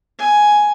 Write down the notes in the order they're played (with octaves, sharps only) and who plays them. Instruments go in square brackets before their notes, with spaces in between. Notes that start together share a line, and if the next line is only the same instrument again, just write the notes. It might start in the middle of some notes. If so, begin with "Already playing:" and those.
[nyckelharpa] G#5